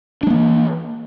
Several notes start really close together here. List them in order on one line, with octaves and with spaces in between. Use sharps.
D4 G#3 A#3 E3